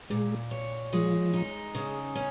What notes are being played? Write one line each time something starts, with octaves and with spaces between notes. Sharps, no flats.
A#2 G#3
C#5
F3 G#3
D#4
C#3
C#4